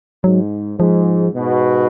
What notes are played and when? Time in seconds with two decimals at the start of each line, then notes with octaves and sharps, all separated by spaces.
0.24 G#2 F#3
0.79 G#2 F3
1.35 G#2 B2